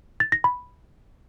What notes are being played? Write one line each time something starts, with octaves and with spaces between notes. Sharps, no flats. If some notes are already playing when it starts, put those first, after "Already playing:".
A6
A#6
B5